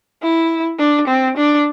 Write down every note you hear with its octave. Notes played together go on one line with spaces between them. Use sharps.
E4
D4
C4
D4